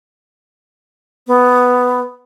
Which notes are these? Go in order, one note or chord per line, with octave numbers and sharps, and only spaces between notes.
B3